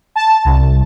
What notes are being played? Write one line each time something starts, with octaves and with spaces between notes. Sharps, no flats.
A5
C2